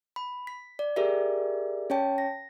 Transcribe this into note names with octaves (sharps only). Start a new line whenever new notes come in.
B5
B6
D5
G4 G#4 A#4 D5 E5
C#4 C#5 G5 A5
A#6